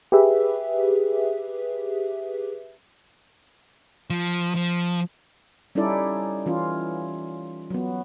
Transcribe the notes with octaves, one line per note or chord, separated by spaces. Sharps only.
G4 G#4 B4 E5
F3
F3
G3 C#4 D#4 E4 A4 D5
E3 C#4 F4
F#3 B3